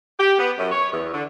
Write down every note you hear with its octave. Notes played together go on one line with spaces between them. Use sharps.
G4
B3
F#2
C#5
E2
D3